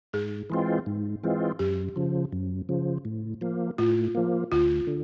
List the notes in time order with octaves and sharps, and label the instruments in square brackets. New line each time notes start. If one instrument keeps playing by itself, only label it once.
[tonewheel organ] G#2 [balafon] G#4
[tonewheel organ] E3 G#3 C4 F4
G#2
E3 G#3 C4 F4
[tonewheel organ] F#2 [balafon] G4
[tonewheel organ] C#3 F3
F#2
C#3 F3
A2
F3 A#3
[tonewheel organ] A2 [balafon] F4
[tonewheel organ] F3 A#3
[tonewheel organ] D2 [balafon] F4
[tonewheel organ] D3